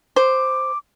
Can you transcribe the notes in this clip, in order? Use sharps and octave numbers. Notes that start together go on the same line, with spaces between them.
C5 D6